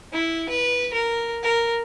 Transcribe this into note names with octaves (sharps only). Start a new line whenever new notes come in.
E4
B4
A#4
A#4